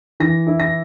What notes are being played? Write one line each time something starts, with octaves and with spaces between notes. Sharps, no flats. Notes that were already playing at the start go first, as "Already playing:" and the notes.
E3 A#6
E4
A#6